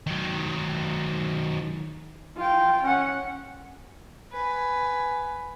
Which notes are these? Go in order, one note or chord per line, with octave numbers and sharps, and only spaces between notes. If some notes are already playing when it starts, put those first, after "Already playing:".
D#3 F#3
F4 G5
C#4 F#5
B4 G#5